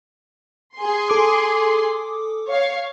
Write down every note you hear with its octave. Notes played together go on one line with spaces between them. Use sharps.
G#4 C6
A4 D6 D#6
C#5 F5